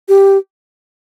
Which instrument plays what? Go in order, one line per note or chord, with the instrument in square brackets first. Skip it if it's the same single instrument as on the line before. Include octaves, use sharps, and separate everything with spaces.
[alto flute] G4